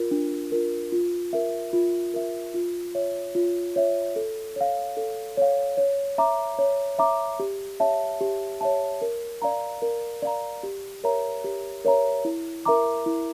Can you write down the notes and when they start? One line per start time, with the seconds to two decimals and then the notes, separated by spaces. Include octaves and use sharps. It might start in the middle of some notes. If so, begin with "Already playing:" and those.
Already playing: F4 A#4
0.11 D4
0.52 F4 A#4
0.92 F4
1.33 A#4 E5
1.73 F4
2.14 A#4 E5
2.54 F4
2.95 C#5 E5
3.35 F4
3.76 C#5 E5
4.16 A4
4.56 C#5 F5
4.97 A4
5.37 C#5 F5
5.77 C#5
6.18 E5 A#5 D6
6.58 C#5
6.99 E5 A#5 D6
7.40 G4
7.80 C#5 E5 A5
8.21 G4
8.61 C#5 E5 A5
9.02 A#4
9.42 D5 F5 A#5
9.82 A#4
10.22 D5 F5 A#5
10.63 G4
11.04 A#4 C#5 E5 A#5
11.44 G4
11.85 A#4 C#5 E5 A#5
12.25 E4
12.65 A#4 E5 A#5 D6
13.06 E4